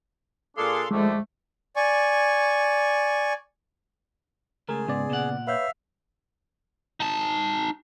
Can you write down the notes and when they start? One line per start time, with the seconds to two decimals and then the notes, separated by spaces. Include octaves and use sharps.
0.57 A#2 D4 G#4 A4 F5 C6
0.91 F2 D3 D#3 F3 G#3 A3
1.76 D5 G#5 C#6
4.69 C#2 A3 G#4 A#4
4.88 G#2 C#3 B3 D5
5.10 A#2 F#5
5.47 B4 C#5 E5 F5 G6
7.00 D#4 A5